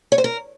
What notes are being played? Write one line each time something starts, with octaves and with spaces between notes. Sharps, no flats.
C#5
C5
A#4